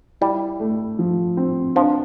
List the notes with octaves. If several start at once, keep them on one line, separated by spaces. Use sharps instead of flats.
G3 E4
A3
F3
C4
F3 D4